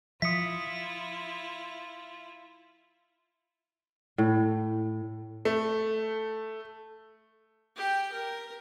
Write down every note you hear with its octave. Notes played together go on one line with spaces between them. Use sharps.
F3 E4 F4 E5 D#6 B6 C#7
A2
A3
G4 G5
A#4